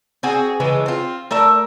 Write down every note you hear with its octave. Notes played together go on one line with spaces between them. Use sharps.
C4 F#4 G#4
C#3 E3 G#3 A3
C4 F4
A3 A#4 E5